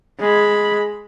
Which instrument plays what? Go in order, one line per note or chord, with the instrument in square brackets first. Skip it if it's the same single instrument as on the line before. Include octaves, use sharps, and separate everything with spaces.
[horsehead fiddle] G#3 B5